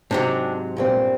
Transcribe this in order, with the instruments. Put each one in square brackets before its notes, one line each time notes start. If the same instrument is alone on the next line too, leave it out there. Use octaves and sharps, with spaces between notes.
[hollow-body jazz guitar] G#2 C3 F#3 [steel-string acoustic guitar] C4 D4
[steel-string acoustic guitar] G2 A#2 C4